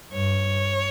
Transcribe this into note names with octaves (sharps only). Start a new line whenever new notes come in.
G2 C#5